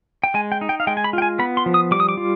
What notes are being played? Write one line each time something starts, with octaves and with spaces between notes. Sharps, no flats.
G5
G#3 G#5
G5
D#4
G5
F5
G#3 G5
G#5
B5
F4 G5
G#5
B3 B5
C6
F3
D#6
G3 D6
D#6
D6
F4